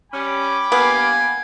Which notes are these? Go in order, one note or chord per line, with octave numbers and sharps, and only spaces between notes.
G3 C#4 G5 B5 D6
G2 A#3 B3 G#5